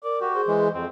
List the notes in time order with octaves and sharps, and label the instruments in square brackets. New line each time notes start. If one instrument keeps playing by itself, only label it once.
[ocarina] A#4 [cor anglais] D5
[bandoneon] F#4 [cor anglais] G4
[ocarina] G#4 [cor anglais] C5
[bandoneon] E3 G#3
[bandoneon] F2 [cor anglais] C4